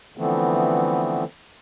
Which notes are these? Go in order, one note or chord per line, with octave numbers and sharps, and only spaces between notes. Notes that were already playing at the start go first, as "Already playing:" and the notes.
D3 E3 F3 A3 B3 C4